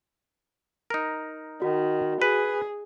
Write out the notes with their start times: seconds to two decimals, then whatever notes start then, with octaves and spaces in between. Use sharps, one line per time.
0.90 D#4 A#4
1.62 D#3 F#4
2.22 G#4 B4